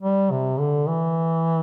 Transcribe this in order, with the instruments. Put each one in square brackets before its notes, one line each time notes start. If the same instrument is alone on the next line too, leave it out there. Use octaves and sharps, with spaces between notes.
[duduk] G3
C3
D3
E3